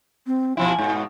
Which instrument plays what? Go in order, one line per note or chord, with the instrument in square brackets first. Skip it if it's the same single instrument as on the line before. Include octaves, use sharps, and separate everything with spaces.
[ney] C4
[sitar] B2 F3 E4 [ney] G#5
[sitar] G#2 B2